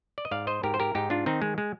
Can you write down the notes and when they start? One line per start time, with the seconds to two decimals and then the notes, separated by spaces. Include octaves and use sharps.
0.18 D5
0.25 D#5
0.31 G#2 D5 F5
0.47 C5 D#5
0.63 G#2 G4 A#4
0.74 C5
0.80 G4 A#4
0.95 G#2 D#4 G4
1.10 D4 F4
1.26 D#3 C4 D#4
1.42 G#3
1.58 G#3